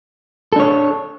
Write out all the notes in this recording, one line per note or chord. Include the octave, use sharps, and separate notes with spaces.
D4 A4 C#5